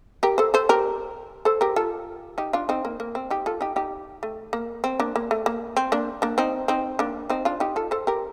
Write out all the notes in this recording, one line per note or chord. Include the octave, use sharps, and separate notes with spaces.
G4 A#4
A4 C5
A4 C5
G4 A#4
A4 C5
G4 A#4
F4 A4
D#4 G4
D4 F4
C4 D#4
A#3
A#3
C4
D#4 G4
F4 A4
D#4 G4
D#4 G4
A3
A#3
C4
A#3 D4
A#3
A3
A#3
C4
A#3 D4
A#3 D4
C4 D#4
C4 D#4
A#3 D4
C4 D#4
D4 F4
D#4 G4
F4 A4
A4 C5
G4 A#4